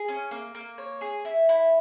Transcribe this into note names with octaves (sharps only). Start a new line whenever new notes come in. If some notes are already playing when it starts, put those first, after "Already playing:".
Already playing: G#4
C#4
A#3
A#3
C#5
G#4
E4
E4